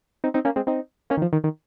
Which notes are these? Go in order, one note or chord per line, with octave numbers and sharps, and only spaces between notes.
C4 D#4
C4 D#4
A#3 C#4
G#3 C4
C4 D#4
A#3 C#4
D#3
F3
D#3
D#3